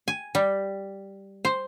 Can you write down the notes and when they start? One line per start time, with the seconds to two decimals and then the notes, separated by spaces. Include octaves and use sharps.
0.08 G#5
0.35 G3
1.45 C5